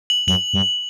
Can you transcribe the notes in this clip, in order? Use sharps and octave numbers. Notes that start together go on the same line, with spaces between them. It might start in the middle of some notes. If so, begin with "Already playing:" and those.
F#7
F#2 F#7
G2